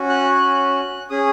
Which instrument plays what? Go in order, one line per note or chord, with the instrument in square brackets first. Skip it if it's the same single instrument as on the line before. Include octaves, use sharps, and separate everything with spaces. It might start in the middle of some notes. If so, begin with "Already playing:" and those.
Already playing: [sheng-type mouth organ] C#4 F#4
F#6
F#6
C#4 G#4 D#6